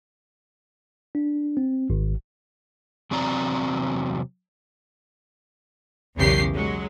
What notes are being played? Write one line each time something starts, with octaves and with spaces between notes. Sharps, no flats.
D4
C4
G#1
E2 C3 F#3 C4 D5 A#5
B1 E2 C#3 G4 A#4 C7
F#3 G#3